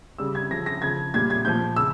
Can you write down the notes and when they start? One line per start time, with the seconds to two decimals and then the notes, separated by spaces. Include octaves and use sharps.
0.18 C#3 G3 E6
0.35 G#6
0.50 C#3 F3 A#6
0.66 A#6
0.82 C#3 F3 G#6
1.14 A#2 G3 G#6
1.30 G#6
1.45 A#2 F3 G6
1.76 C#3 E6